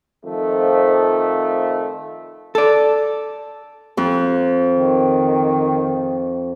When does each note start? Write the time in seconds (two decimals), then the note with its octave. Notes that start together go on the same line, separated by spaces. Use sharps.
0.25 F2 D#3 F3 A3
2.55 A4 D5
3.97 F2
4.73 D#3